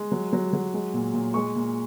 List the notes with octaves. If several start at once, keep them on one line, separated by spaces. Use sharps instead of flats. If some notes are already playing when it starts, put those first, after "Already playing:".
Already playing: G#3
F#3
F#3
F#3
G#3
A#2
A#2
G#3 C#6
A#2